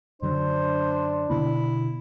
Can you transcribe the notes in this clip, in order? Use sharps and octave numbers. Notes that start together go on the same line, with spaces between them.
F#2 D3 F#3 D4 C5
B2 D3 B3 E4